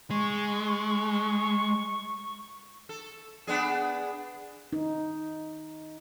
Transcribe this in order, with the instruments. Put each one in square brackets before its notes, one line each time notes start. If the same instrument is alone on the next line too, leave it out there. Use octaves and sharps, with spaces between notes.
[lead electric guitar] G#3 [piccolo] C#6
[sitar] A4
B3 D4 G#4
[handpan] D#4